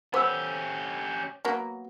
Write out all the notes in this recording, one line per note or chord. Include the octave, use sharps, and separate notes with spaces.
B3 C#4 G4 C5 D6 E6
F#3 A#3 B3